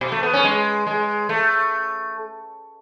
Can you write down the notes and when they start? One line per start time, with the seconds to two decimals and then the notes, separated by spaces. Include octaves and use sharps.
0.01 B2
0.12 A3
0.23 B3
0.33 C#4
0.44 G#3
0.87 G#3
1.29 A3